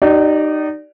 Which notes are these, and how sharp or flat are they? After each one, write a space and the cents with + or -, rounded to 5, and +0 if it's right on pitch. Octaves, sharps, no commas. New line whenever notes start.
D#4 -20 G4 -40 D5 +0